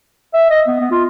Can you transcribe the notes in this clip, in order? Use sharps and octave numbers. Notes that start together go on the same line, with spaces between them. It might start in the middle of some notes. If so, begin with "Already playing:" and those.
E5
D#5
B3
B3
F4